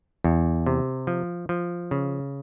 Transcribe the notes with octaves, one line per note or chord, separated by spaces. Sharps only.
E2
C3
F3
F3
C#3